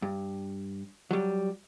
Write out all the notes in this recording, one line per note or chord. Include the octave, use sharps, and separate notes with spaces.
G2
F#3 G3